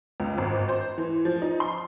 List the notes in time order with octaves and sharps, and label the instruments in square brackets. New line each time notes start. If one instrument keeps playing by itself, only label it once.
[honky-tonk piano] C#2
G#1
C5
E3
F3
D#4
C6